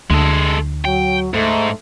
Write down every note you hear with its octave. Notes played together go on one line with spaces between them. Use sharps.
D2 G#3 A4
F#3 G5
G#2 A3 A4